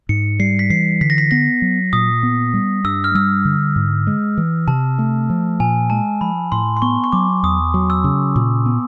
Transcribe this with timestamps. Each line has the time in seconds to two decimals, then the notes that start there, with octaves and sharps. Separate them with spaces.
0.09 G#2 C#7
0.39 G3 C7
0.59 B6
0.70 E3 C7
1.01 D3 B6
1.10 A#6
1.18 B6
1.31 B3 A#6
1.62 F#3
1.93 A#2 D#6
2.23 B3
2.54 G3
2.84 G2 E6
3.04 F6
3.15 G3 E6
3.45 D3
3.76 G#2
4.07 G#3
4.37 E3
4.68 C3 A5
4.99 A3
5.30 F3
5.60 A#2 G#5
5.90 G#3 A5
6.21 F3 B5
6.52 A2 C6
6.77 C6
6.82 B3 C#6
7.04 C#6
7.12 F#3 D6
7.43 E2 D#6
7.74 F#3
7.90 E6
8.04 C#3
8.36 A#2
8.66 B3